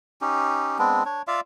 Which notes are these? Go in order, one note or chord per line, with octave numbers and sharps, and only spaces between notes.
C#4 D#4 G4
G#3 B3 C4 D4
D4 C#5
F4 D5 E5 F5